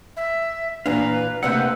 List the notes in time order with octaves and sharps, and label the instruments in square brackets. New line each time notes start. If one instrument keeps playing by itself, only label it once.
[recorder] E5
[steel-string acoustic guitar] A#2 E3 [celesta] D4 [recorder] B4 [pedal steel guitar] F5 A#5
[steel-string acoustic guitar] D2 C3 A#3 [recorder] B4 [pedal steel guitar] F#5 G6 [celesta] E6